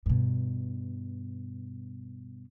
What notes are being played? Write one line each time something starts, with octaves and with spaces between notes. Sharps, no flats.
G2 B2